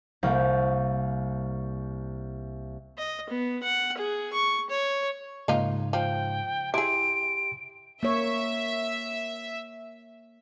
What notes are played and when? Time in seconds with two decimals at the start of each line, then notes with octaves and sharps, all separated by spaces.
0.23 C2 A#3 G6
2.98 D#5
3.30 B3
3.63 F#5
3.97 G#4
4.33 C#6
4.70 C#5
5.48 G#2 C#3 A#3 D#4 F4
5.93 F3 G5
6.74 E4 G4 G#4 G5 C6 D7
8.03 A#3 C#5 E5